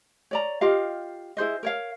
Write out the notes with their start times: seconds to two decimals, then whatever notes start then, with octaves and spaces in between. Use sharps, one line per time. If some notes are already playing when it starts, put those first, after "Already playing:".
0.31 C#5 D5 A#5
0.61 F4 G4 D#5 F5
1.37 E4 G#4 C5 D#5
1.63 A#4 C#5 F5